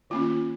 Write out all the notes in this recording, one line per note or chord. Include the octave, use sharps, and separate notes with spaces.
D#3 A#3 C#4 F4